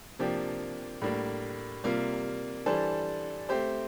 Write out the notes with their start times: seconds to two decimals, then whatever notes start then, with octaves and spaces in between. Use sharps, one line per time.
0.19 C3 F3 A#3 D4 G4
1.01 A2 G3 A#3 D4
1.84 C3 G3 A#3 F4
2.66 E3 G3 D4 A4 C5
3.49 A3 C4 G4 C5